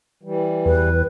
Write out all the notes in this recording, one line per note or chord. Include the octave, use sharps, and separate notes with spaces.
E3 G3
E2 B4